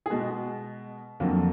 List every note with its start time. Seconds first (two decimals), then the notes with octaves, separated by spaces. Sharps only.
0.06 G#4
0.10 B2 G#3 B3 F#4
1.20 F2 D3 F#3 A#3 F4